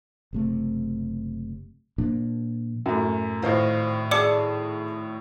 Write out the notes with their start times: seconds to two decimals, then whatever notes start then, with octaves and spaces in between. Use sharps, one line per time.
0.33 F#1 C3 A3
1.98 A#2 F3 A#3 D4
2.86 F#2 A2
3.42 G#1 A2 F4 C5 D#5
4.11 G#4 D5 A5 D6 E6 C#7